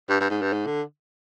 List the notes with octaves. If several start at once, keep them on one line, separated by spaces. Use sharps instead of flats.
G2
G2
G#2
G2
G#2
D3